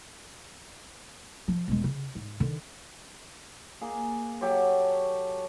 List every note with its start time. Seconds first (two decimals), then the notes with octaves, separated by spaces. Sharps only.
1.48 F3
1.68 E1 G#3
1.84 C#3
2.15 G#2
2.40 D3 D#3
3.81 A#3 G#4
4.41 F#3 G4 A4 C#5